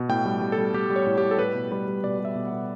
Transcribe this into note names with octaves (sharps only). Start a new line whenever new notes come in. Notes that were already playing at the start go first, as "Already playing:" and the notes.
Already playing: B2
A2 G5
G3
G3
A4
G3
G3 G4
G3
C#5
A2
G4
A2
A4
G3 B4
B2
G3 B4
G3
B2 D5
G3
E5
B2
F#5
B2